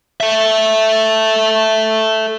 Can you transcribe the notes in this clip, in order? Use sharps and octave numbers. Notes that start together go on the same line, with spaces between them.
A4 E5